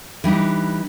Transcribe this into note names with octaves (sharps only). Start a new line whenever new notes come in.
E3 G3 D4 D#4